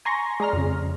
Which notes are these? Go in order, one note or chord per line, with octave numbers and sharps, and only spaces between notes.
G#5 A#5 C6 C#6 A#6
G#3 D5 A#5 F6
F2 C#3